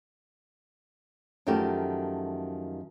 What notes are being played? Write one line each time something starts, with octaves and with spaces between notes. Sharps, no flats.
F#2 D#3 F3 A3 G4 A5